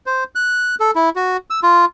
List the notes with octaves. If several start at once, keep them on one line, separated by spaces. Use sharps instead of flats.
C5
F#6
A4
E4
F#4
E6
F4